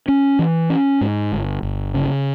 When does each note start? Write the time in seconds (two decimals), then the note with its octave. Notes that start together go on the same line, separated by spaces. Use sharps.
0.08 C#4
0.39 E3
0.70 C#4
1.01 G#2
1.32 G1
1.63 G1
1.94 C#3